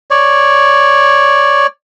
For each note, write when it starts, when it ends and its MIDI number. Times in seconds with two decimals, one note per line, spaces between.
0.11 1.67 73
0.11 1.67 74